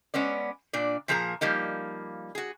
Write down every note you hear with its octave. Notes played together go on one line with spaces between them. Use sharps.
G#3 B3 C#4 D5
A#2 D4 D5
A#2 F3 A#3 G#4 A#5
F3 G3 A#3 D#4
F#4 G#4